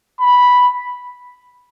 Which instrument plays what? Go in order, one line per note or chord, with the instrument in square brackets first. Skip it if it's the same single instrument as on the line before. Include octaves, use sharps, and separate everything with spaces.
[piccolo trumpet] B5